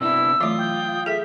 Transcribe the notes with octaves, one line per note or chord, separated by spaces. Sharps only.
C3 B3 D4 E4 E6
E3 F#3 A3 F4 D#6
G5
G#4 A4 E5 B6